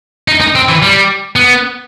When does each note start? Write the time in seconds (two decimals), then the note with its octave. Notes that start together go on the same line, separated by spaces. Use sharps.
0.28 D#4
0.41 D#4
0.55 C4
0.69 E3
0.82 G3
1.36 B3